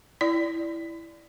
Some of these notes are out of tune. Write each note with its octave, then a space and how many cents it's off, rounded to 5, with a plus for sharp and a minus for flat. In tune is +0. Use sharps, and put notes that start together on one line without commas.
E4 +5 D5 +0